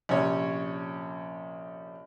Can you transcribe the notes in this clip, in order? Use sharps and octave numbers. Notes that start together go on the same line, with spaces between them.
A#1 C3 C#4 C#5